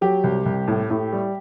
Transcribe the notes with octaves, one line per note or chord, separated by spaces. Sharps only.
F#3 G4
C2
C2
A2
A2
G3